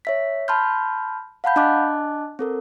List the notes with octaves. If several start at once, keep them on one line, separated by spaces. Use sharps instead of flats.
C#5 E5 B6
A5 B5 C6 F6 G6
F5 F#5 A5 B5 G6
D4 D#5 A5 D6 F#6
C4 A4 A#4